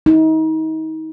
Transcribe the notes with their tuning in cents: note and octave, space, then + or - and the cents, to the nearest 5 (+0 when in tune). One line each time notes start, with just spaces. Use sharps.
D#4 +35